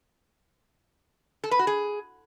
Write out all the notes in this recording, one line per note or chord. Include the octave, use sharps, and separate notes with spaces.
A4
B4
F#4
G#4